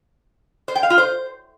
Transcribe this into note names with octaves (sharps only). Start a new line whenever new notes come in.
C5
G5
F5
F4
C5